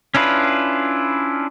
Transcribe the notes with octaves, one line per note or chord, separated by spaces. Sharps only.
C#4 D4 E4 F4 B4